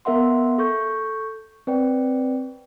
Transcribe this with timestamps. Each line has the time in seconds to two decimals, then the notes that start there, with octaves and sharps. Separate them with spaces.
0.05 B3 A#4 E5 F#5 C6
0.58 A4 C#6 G6
1.67 C4 B4 D5 G5